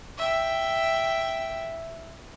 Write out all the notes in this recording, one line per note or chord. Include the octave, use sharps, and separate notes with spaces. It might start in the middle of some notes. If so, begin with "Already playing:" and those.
E5 G5